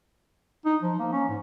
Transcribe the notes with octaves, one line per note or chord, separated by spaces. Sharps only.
D#4
F3
A#3
C#4
G#2